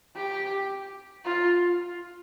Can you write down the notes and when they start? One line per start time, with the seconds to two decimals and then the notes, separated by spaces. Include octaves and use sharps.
0.15 G4
1.25 F4